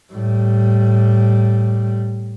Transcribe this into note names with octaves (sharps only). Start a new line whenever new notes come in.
A2 G3